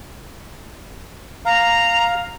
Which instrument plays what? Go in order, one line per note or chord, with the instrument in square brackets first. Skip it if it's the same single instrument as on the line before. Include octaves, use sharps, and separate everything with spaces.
[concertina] F5 [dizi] A#5